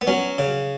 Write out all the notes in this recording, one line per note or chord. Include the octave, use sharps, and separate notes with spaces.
B3
F#3 C#4
C#3